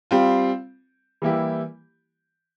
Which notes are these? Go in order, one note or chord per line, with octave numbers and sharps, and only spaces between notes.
G3 C4 F4
E3 G3 A#3 E4 G4